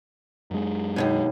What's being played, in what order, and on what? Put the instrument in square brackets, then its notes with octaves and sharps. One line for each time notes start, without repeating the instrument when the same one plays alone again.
[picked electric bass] F#2 G#3
[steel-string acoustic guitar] D#2 G#2 B2